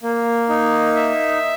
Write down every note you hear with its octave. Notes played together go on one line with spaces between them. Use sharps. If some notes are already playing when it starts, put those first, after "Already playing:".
A#3
D#4
E5